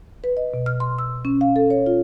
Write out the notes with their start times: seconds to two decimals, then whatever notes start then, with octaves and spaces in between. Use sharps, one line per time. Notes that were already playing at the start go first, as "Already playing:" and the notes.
0.24 B4
0.37 D#5
0.54 B2
0.66 F6
0.80 C6
0.99 E6
1.25 C#4
1.41 F5
1.56 A4
1.70 C#5
1.86 F4